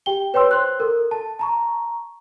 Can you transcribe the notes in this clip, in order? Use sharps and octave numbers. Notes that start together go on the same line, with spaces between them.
G4 G5 G7
B4 C#5 G5 C6 E6
C5 C6 F#6
A4 A#4
A5
A5 A#5 C#6